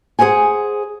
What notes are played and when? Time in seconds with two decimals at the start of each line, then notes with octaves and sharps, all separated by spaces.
0.19 G#4 A4 C5 F#5 G#5